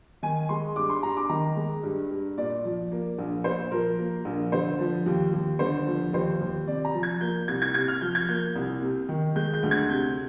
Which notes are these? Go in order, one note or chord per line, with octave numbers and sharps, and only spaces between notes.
D#3 G#5
G#3 C6
G2 D6
C6
G2 A#5
D6
D#3 A#5
G#3
G2
G2
A#2 D5
F3
A#3
A#1
A#2 C5
F3 A#4
A#3
A#1
D3 C5
F3
D#2
D#2
D3 C5
F3
D#2 C5
D#2
C3 D5
A#5
F3
G#6
A#3 G6
C2 G#6
G#6
C3 G#6
F6
F3 G6
G#6
A#3 G6
C2
C3
D#3
G#3 G6
G6
D2
G#6
C3 G6